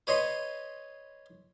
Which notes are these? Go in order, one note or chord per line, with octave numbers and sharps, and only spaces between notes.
B4 C#5 D#5 C6